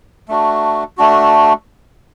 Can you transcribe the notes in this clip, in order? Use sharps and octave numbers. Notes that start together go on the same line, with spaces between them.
A3 D4 F#4
A3 D4 F#4